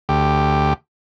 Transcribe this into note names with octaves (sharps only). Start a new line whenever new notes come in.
D2 G4